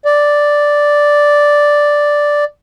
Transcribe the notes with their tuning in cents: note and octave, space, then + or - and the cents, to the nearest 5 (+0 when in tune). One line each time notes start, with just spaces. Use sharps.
D5 +0